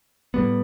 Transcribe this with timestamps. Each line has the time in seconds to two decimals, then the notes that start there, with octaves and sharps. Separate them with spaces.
0.34 A2 G3 B3